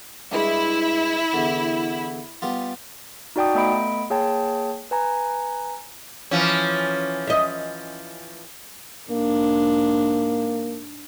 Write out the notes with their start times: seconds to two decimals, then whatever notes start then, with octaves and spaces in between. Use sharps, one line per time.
0.32 G2 G#3 E4 D#6
1.33 E2 D3
2.42 G3 B3 F4
3.36 D#4 F#4 D5 G5 A5 D#6
3.55 A3 B3 D#5 B5 D7
4.10 A#3 G#4 C#5 G5 A5
4.91 B4 G#5 A#5
6.31 E3 F3 C#4
7.27 D#5 E5
9.11 G#2 A#3 D4